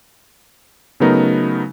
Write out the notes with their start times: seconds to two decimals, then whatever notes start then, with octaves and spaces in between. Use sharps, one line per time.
1.00 C#3 F#3 A3 B3 D#4 A#4